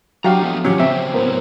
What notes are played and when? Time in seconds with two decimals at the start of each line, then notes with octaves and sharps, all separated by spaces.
0.24 F#3 D4 F#4 G4 F5 G5 A#5
0.42 F3 A3 B3
0.65 C3 E3 F#3 C#4 F4 G4
0.79 C#3 C4 F#4 C5 E5
1.14 A2 F#3 B3 A#4 C5